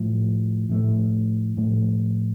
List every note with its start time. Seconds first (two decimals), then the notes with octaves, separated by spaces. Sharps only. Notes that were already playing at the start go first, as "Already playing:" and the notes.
Already playing: A2 F3 A3
0.69 A2 F3 A3
1.57 A2 F3 A3